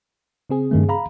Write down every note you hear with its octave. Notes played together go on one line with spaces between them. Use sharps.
C#3 C4 G#4
G2 D#3 A3
F5 A#5 B5